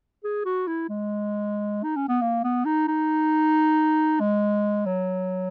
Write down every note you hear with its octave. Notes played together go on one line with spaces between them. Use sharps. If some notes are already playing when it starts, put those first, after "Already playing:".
G#4
F#4
E4
G#3
D#4
C#4
B3
A#3
B3
D#4
D#4
G#3
F#3